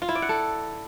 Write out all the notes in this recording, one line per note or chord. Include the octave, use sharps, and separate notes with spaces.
F4
E4
D5
F#5
A4